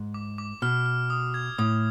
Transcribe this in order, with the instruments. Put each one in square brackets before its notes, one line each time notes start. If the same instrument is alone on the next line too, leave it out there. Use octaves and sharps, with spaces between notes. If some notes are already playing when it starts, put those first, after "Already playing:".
Already playing: [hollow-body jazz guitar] G#2
[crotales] D6
D6
[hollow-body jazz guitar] B2 [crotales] F6
[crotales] F6
D#6
G#6
[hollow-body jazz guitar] A2 [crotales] D#6